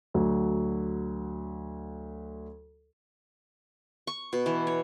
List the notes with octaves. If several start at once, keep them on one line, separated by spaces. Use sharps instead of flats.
D2 F#3
C#6
B2
E3
C#5